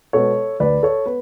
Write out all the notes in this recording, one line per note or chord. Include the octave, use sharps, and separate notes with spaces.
B2 G#3 B3 A4 C#5
D2 B4 D5
A4 C#5
B3 B4